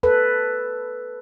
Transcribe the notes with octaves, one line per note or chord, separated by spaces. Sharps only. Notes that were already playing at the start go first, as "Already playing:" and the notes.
A4 B4